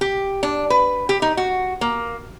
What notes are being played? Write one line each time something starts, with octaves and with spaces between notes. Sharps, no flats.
G4
D4
B4
G4
D#4
F#4
A#3